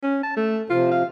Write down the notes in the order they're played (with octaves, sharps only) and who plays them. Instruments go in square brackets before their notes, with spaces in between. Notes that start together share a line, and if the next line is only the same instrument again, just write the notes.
[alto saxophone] C#4
A5
A3
[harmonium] C3 F3 [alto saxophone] F4
[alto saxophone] F5